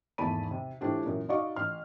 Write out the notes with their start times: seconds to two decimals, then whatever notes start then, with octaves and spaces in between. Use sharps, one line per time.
0.18 G#1 E2 A3 A5 B5 D#7
0.51 C3
0.81 A2 E3 C4 D4 F4 G4
1.04 F#2 A#2 E3
1.29 D#4 F#4 D5 D#5 F5 C#6
1.56 A1 C6 F6